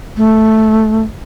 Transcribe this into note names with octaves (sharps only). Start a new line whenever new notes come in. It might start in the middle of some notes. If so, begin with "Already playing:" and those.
A3